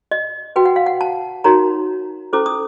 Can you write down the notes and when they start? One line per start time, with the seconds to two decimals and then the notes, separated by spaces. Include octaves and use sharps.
0.11 D#5
0.56 F#4 B4 G5
0.65 F#5
0.76 F5
0.86 F#5
1.01 A5
1.44 D#4 F#4 A#4 C#5 A#5
2.33 C#4 E4 A4 C5 D6
2.46 D#6